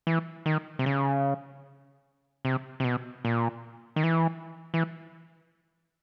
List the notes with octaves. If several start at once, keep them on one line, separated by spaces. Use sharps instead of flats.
E3
D#3
C3
C#3
C3
C3
B2
A#2
D#3
E3
E3